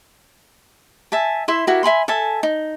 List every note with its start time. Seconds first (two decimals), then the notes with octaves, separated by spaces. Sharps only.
1.12 E5 G#5 A5
1.48 E4 E5 C6
1.67 E4 F#4 G4 A#4
1.83 E5 G#5 B5 C6
2.08 A4 E5 G#5 A5
2.43 D#4